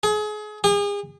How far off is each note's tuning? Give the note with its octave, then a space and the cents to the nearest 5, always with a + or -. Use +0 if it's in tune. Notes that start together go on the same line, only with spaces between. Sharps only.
G#4 +30
G#4 -40